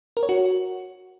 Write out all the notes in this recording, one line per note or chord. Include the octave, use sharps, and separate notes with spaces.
A#4
C#5
F#4